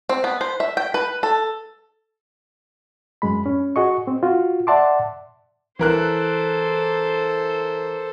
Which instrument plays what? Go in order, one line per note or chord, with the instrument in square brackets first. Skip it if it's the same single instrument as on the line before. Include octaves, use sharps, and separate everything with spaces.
[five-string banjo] C4
B3
C5
E5
G5
B4
A4
[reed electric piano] F#2 G#3 B5
C#4
F#4 G#4 D#5 C#6
C4
F4 F#4
D5 E5 F#5 A5 C6 D6
[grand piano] E3 A#4 F#6 [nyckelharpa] A4 C5